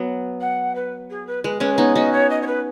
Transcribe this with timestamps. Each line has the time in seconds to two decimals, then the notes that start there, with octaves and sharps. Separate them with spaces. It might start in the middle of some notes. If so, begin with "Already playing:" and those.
Already playing: F#3 B3
0.40 F#5
0.75 B4
1.10 G#4
1.27 B4
1.44 G#3 B4
1.60 G#3 C#4 B4
1.74 B4
1.78 B3 D#4 C#5
1.95 C#4 F#4 D#5
2.12 C#5
2.30 D#5
2.41 C#5
2.46 B4